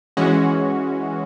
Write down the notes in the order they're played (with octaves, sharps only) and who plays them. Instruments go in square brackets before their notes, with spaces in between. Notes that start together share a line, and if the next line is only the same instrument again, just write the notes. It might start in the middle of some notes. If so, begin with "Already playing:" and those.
[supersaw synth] E3 G#3 C#4 F#4